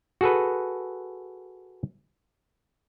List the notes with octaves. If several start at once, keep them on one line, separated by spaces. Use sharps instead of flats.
F#4 G#4 A4 B4